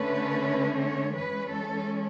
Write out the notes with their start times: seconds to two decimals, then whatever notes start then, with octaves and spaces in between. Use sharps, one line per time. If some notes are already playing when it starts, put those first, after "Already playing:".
Already playing: D3 A3 C#4 B4
0.79 C#5
1.16 E3 G#3 C#4 B4
1.53 A4